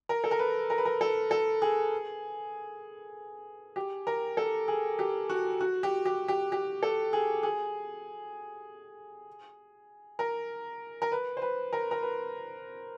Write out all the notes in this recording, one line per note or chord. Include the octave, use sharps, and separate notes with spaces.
A#4
A4
A#4
B4
A#4
B4
A#4
A4
A4
G#4
G4
A#4
A4
G#4
G4
F#4
F#4
G4
G4
G4
G4
A4
G#4
G#4
A#4
A#4
B4
C5
B4
A#4
A#4
B4